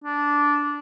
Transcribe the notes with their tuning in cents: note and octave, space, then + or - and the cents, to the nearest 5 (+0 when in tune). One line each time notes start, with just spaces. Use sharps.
D4 -10